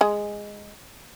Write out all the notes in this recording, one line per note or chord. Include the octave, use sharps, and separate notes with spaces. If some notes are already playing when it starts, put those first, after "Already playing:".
G#3 G#4